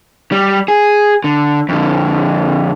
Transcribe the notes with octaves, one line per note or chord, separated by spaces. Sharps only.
G3
G#4
D3
F2 D3